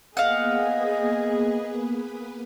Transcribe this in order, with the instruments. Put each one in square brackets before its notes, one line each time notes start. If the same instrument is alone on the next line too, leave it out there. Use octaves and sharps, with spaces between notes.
[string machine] A#3 B3 B4 [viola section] G#4 [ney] D#5 [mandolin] F5 F#5